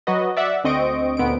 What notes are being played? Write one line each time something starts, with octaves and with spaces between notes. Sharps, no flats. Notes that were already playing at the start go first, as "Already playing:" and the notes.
F#3 F#4 B4 D#5
D5 E5 F#5
D2 C4 D#5 C#6 D7
D2 A#2 B3 C4 D7